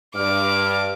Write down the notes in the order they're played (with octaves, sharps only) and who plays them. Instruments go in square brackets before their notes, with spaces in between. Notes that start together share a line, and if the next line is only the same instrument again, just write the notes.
[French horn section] G2 [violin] D6 [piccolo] F6